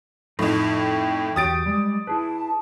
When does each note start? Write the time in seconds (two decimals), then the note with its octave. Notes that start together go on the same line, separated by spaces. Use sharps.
0.39 F2 A2 F3 D#4 F4
0.78 G5
1.36 E2 F#4 G4 D#6 A6 D7
1.66 G3 G#3 D5
2.07 E4 G#4 B4 A5